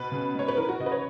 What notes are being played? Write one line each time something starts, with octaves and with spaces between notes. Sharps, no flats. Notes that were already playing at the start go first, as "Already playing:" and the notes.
Already playing: B2 B4
C#3
G#3 C#5
B4
E3 A#4
F#4
C#3 D#5
B4
C#5